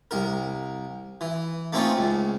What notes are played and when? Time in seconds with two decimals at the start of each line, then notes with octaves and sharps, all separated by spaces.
0.11 C2 A#4
1.21 E3
1.73 A3 A#3 C4 C#4 D#4 F4
1.97 C#2